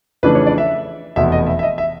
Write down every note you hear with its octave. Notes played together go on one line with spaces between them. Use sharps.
F2 C#3 E3 A3 D4 B4
C#5
D5
E5
F1 E2 B2 E5
D#5
E5
E5
D#5
E5